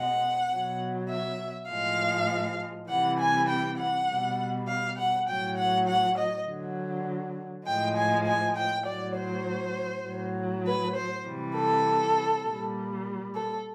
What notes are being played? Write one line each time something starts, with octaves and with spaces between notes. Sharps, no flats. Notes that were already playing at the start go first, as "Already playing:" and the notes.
Already playing: B2 G#3 F#5
B2 F#3
E5
A2 F3 G#3 F5
C3 E3 G3 F#5
G#5
G5
F#5
B2 G3
F5
F#5
A2 F#3 G5
F#5
F#5
D#5
D3 F#3
A2 F3 G#3 G5
G#5
G#5
G5
A2 F#3 D5
C5
A2 F#3
B4
C5
C3 E3 G3
A4
A#2 G3
A4